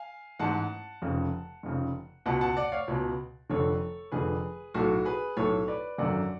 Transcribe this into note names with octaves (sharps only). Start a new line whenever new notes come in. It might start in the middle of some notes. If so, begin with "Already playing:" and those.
Already playing: F5 G#5
A1 G#2 F#5 A5
F1 F2 C#3
F1 F2 C#3
C#2 B2 F#5 A5
F#5 A5
D5 F#5
C#5 F5
C#2 B2
F1 F2 D3 A4 C#5
F1 F2 D3 G#4 B4
B1 A2 F#4 A4
G#4 B4
B1 A2 A4 C#5
B4 D5
G#1 F#2 D3 D5 F#5